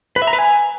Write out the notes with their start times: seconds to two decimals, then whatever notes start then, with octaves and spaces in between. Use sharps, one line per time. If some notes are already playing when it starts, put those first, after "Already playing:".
0.16 B4
0.22 E5
0.27 A#5
0.33 B4
0.39 G#5